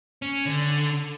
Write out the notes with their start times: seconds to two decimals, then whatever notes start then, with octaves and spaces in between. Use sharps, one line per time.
0.22 C#4
0.46 D3